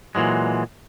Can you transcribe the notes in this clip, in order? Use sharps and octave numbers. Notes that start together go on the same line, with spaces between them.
A#2 E3 F#3 G#3